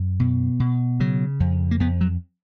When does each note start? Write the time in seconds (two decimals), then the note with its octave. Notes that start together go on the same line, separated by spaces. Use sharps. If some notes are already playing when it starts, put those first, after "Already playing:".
Already playing: F#2
0.20 B2
0.60 B2
1.00 C#3 F#3
1.40 F2
1.71 A#3
1.80 F2 B3
2.01 F#3